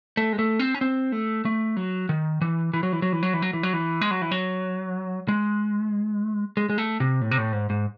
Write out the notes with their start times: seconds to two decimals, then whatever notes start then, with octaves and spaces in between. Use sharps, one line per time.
0.17 A3
0.33 G#3
0.39 A3
0.59 C4
0.75 C#4
0.81 C4
1.12 A3
1.45 A3
1.77 F#3
2.09 D#3
2.41 E3
2.73 E3
2.83 F#3
2.92 E3
3.02 F#3
3.13 E3
3.23 F#3
3.33 E3
3.42 F#3
3.53 E3
3.63 F#3
3.73 E3
4.01 G#3
4.11 F#3
4.22 E3
4.31 F#3
5.28 G#3
6.57 G#3
6.70 G#3
6.78 A3
7.00 C3
7.21 A2
7.31 C3
7.38 A2
7.53 G#2
7.70 G#2